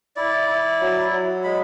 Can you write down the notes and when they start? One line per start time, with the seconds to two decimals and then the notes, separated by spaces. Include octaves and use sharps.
0.16 E4 D5
0.49 E4
0.81 F#3
1.12 F#3
1.44 G#3 B5